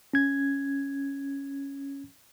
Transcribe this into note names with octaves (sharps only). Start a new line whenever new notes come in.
C#4 G#6